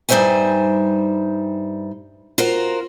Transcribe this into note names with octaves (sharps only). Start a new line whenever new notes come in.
G2 G3 D#4 C5 E5 G#5
F4 F#4 A#4 C5